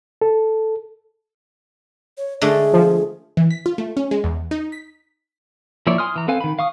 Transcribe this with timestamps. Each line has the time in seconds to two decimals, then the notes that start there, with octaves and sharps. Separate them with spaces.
0.21 A4
2.18 C#5
2.41 D3 G#3 A3 G#4
2.73 F3
3.37 E3
3.50 B6
3.66 F4
3.78 A3
3.97 C#4
4.11 G#3
4.24 E2
4.51 D#4
4.72 B6
5.87 F3 A#3 E4 C#5 D5
5.98 G#5 C6 D#6 F6
6.16 E3 A#5
6.28 C4 A4 B4 F5 G#5
6.41 D#3 B5
6.59 F5 C#6 D#6